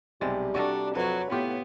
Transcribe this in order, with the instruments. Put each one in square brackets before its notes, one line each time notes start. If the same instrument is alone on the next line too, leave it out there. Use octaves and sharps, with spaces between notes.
[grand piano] B1 A6 [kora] C3 G#3 [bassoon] G3
[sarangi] D4 [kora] F#4 A4 A#4 [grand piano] C#6
[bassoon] F2 [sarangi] F#3 [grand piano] B4 C#5
[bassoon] A2 [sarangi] B3 [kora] F4 G4